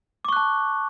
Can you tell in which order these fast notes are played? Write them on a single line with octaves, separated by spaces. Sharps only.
D6 C#6 F#6 A5